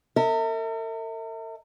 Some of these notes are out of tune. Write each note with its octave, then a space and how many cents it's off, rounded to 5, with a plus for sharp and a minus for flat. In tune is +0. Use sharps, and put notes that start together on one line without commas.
A#4 -45 E5 -30